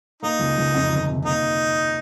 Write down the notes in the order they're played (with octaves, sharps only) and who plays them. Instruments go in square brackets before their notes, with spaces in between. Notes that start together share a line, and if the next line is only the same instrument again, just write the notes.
[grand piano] A#3 [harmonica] D#4
[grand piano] C#2
C#2
F2
G1
C3
[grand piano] A#3 [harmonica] D#4